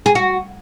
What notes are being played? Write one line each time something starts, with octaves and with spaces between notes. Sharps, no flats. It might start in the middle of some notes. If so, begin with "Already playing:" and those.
G#4
F#4